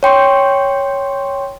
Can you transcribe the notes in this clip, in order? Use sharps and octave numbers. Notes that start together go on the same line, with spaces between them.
C#5 G5 C6 C#6